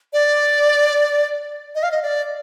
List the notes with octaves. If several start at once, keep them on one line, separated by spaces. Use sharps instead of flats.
D5
D#5
F5
D#5
D5